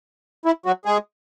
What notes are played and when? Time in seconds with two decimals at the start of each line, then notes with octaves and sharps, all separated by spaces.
0.45 E4
0.66 F#3 F#4
0.85 G#3 G#4